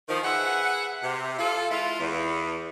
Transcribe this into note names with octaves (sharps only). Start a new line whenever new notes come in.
D#3 F3
G#4 B4 E5 F#5
C3
F4 A4
G#3 E4 F4
E2